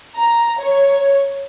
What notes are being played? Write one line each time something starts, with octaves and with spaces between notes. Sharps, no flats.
A#5
C#5